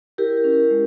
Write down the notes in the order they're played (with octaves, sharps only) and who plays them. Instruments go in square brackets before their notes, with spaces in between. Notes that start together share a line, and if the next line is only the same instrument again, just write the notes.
[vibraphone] E4 G4 A#4
C#4
G#3